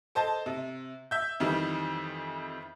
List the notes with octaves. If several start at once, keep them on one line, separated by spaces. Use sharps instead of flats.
A4 C5 D#5 A5
C3
E5 G6
F2 D#3 E3 G3